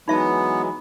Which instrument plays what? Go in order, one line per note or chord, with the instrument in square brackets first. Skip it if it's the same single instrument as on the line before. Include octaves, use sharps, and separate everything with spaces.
[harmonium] E3 F#3 G#3 [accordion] B3 [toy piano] D#4 E5 A5 [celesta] B5